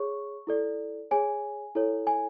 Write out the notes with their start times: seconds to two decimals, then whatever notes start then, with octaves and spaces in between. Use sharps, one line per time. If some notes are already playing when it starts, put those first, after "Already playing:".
Already playing: G#4 C#5 C#6
0.47 E4 A4 D5
1.11 G#4 C#5 G#5
1.75 E4 A4 C#5
2.07 G#5